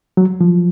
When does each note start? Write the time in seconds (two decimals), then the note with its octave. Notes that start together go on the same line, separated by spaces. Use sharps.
0.17 F#3
0.41 F3